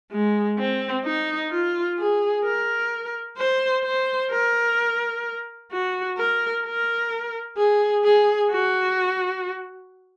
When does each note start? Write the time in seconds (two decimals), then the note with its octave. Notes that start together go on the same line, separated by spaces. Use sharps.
0.11 G#3
0.59 C4
1.05 D#4
1.51 F4
1.98 G#4
2.45 A#4
3.38 C5
3.85 C5
4.31 A#4
5.72 F#4
6.17 A#4
6.64 A#4
7.57 G#4
8.04 G#4
8.51 F#4